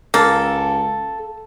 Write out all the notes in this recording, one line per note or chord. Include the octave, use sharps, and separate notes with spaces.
C#2 A#3 A4